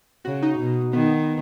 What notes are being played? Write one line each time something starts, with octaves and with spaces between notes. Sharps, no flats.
C#3 F#4
D#4
B2
D#3 B3